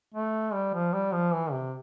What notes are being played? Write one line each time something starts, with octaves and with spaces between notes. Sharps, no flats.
A3
G3
F3
G3
F3
E3
C3